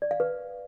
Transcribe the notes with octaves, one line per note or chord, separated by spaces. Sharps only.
D5
F5
B4